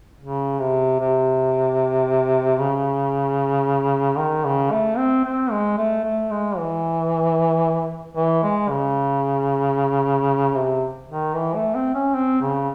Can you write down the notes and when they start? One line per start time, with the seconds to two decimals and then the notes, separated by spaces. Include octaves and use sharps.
0.21 C#3
0.60 C3
1.00 C3
2.59 C#3
4.18 D#3
4.45 C#3
4.72 A3
4.98 C4
5.24 C4
5.51 G#3
5.78 A3
6.04 A3
6.31 G#3
6.58 E3
8.17 E3
8.43 G#3
8.70 C#3
10.56 C3
11.09 D#3
11.35 E3
11.55 A3
11.75 C4
11.95 C#4
12.15 C4
12.41 C#3